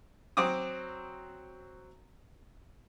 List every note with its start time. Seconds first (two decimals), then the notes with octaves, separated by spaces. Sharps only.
0.37 F#3 C4 D6 D#6